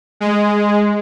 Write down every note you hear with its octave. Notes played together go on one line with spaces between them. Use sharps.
G#3